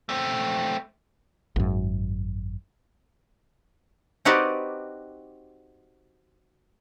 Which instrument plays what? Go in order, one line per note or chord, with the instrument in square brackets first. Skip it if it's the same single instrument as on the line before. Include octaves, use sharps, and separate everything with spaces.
[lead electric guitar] A3 C4
[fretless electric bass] G#1 F#2
[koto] C4 D#4 F#4 G4 B4 D5